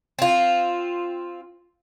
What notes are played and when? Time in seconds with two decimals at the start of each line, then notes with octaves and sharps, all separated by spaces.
0.19 C4 F4